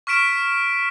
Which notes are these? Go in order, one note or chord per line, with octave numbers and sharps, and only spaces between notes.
C#6 F6 B6 D7 E7